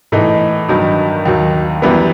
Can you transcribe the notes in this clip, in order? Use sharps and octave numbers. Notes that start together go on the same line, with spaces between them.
A2 E3 A3 D#4
G2 D#3 F#3
D#2 D#3 F#3
F#2 E3 G3 B3